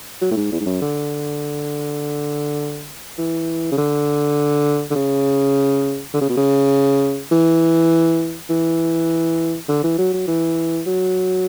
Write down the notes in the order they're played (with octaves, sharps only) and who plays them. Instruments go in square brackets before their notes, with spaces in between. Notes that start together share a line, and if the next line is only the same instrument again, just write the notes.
[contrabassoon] F#3
A2
G#2
E2
G#2
F#2
D3
E3
C#3
D3
D3
C#3
D3
C#3
B2
C#3
E3
E3
D3
E3
F#3
F#3
E3
F#3